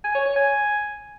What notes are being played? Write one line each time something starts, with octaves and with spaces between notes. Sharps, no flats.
G#5
C#5
C#5
G#5